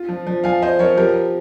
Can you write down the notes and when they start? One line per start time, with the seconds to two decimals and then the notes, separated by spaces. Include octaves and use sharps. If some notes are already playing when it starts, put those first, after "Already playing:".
Already playing: F4
0.09 F3
0.27 F3
0.44 F3 F5 G#5
0.62 C4 C5 D#5
0.79 F3 A#4 C#5
0.97 F3 G4 A#4